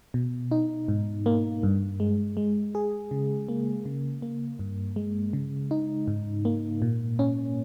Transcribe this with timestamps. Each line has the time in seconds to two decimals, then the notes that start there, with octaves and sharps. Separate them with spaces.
0.14 B2
0.51 D#4
0.88 G#2
1.26 A#3
1.63 G2
2.00 G#3
2.37 G#3
2.75 G#4
3.11 C#3
3.48 A#3
3.86 C#3
4.22 A#3
4.59 G2
4.96 G#3
5.33 C#3
5.71 D#4
6.08 G#2
6.45 A#3
6.82 A#2
7.19 C#4